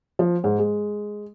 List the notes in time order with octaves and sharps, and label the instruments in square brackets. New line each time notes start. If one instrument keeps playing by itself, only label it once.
[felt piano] F3
G#2
G#3